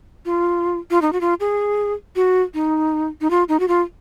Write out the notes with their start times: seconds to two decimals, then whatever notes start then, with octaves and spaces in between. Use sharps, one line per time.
0.25 F4
0.91 F4
1.02 D#4
1.13 F#4
1.21 F4
1.40 G#4
2.16 F#4
2.54 D#4
3.21 D#4
3.30 F4
3.49 D#4
3.60 F#4
3.68 F4